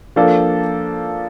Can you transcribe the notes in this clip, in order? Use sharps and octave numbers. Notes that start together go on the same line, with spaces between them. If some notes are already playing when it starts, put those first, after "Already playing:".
F3 A#3 D4 A4 D5